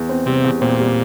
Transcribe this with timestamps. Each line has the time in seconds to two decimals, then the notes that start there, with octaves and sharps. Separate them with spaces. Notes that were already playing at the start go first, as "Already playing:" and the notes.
Already playing: E2
0.09 C4
0.26 C3 G3
0.44 E2
0.61 A#2 C4
0.80 G3